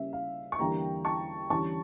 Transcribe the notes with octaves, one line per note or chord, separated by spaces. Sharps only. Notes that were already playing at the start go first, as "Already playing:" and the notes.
Already playing: C#3 G3 A#3 C#4 E5
F5
C#6
E2 D3 G3 A#3 G5 A#5
A5 C#6
E2 D3 G3 C#4 A5 C#6